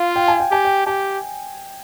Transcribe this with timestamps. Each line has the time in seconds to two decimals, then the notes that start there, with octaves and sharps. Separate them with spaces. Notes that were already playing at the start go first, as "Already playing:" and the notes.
Already playing: F4 F5
0.16 G5
0.28 G#5
0.40 G5
0.51 G4 G#5
0.65 G5
0.87 G4 G#5